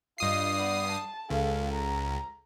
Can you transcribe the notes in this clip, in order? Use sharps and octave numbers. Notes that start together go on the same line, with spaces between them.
G2 F4 D#5 D#6 C7
B3 D5
A5
C#2 A4 F5
A#5